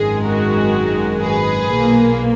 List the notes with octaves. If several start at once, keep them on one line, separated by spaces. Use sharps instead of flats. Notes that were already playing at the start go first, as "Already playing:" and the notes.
Already playing: G#1 F#2 D#3 G#3 G#4
F#4 A#4
G#4 B4
B1 A#2 A#3